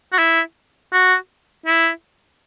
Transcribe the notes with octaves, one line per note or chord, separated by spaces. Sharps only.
F#4
E4
F#4
E4